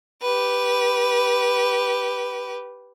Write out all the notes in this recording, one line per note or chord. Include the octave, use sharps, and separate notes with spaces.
G4 B4